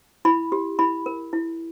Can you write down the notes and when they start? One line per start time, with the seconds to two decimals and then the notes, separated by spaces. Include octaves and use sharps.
0.25 E4 B5
0.52 G4
0.79 E4 B5
1.06 A#4
1.33 E4